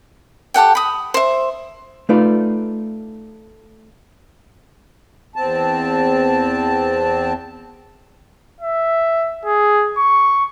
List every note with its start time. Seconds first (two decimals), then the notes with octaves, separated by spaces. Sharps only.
0.54 G4 A4 F#5 G5
0.75 B5 D#6
1.14 C5 E5
2.09 A3 D#4 F4 B4 D5
5.36 E2 C4 A5
8.61 E5
9.46 G#4
9.98 C#6